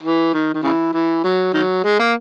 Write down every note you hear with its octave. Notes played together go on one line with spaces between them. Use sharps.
E3
D#3
D#3
C#3 E3
E3
F#3
D#3 F#3
G#3
A#3